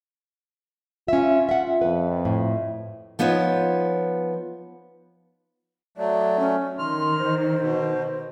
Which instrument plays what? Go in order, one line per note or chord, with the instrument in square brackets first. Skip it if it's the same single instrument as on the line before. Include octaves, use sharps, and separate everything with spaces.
[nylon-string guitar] C#4 E5 [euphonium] F4
[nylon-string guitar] E5 F#5
[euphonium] F2 [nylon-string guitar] B4
[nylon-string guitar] A2
F3 B3 D#4 B4 C#5
[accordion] F#3 A3 [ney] D5
[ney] C#4
[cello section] D#3 [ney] C6 [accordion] F6
[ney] C5
[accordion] B2